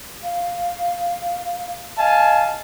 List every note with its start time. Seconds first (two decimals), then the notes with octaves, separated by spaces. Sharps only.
0.23 F5
1.98 D#5 F5 G#5 A5